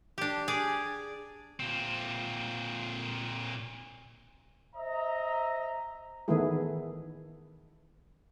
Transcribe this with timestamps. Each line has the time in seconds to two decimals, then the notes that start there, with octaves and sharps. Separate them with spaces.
0.18 D4 G4
0.48 G#4 D5
1.60 A#2 C4
4.76 C5 D#5 E5 A#5
6.28 D#3 E3 A3 B3 E4 G#4